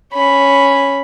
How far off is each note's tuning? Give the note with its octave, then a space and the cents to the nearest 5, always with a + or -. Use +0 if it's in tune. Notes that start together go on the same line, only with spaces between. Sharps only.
C#4 +0 B5 +0